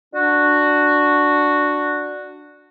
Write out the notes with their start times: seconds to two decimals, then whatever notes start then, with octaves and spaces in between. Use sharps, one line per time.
0.13 D4 F#4